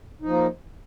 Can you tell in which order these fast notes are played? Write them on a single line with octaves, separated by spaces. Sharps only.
D#4 F3 A#3